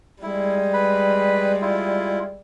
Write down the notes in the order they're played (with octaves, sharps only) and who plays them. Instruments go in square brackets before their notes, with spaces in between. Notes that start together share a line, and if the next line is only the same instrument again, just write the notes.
[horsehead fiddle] G3 G#3 [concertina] E4
[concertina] B4 B5
E4 F4